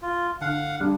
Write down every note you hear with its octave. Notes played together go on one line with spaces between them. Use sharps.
F4
D3 F5 F#5
G3 D4 G4